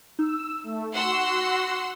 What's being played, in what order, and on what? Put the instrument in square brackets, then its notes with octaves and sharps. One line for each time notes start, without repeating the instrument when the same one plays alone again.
[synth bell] D#4 [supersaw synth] E6
[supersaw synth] A3
[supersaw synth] F#4 [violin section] F#5 C6 E6